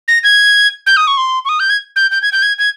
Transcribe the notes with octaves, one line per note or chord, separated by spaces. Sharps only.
A#6
G#6
G6
D#6
C#6
C6
C#6
D#6
G6
G#6
G6
G6
G#6
G6
G#6
G#6